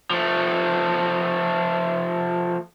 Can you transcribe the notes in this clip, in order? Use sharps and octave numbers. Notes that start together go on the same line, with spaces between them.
F3 A3